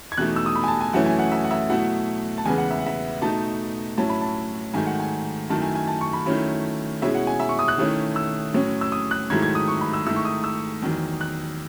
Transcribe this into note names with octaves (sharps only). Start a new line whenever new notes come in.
G#6
E2 B2 A3 D#4 F#6
E6
D#6
B5
G#5
A5
G#5
F#2 E3 A3 C#4 E4 F#5
G#5
F#5
E5
F#5
E5
B2 F#3 A3 E4 F#5
A5
E2 C#3 G#3 B3 G#5
F#5
E5
F#5
E5
B2 A3 D#4 A5
A2 F#3 C#4 E4 A5
B5
A5
G#2 D#3 F#3 A3 G#5
F#5
G#5
F#2 D#3 A3 E4 A5
G#5
G#5
A5
C#6
B5
D#3 F#3 A3 C#4 E4
B2 G#3 C#4 E4 E5
F#5
G#5
E5
C#6
D#6
F#6
D#3 A3 C#4 E4
E6
A2 F#3 C#4
E6
D#6
F#6
G#2 D#3 F#3 A3 E4 G#6
G#6
D#6
C#6
B5
E6
G#2 D#3 A3 E4 E6
C#6
D#6
E6
E2 D#3 F#3
F#6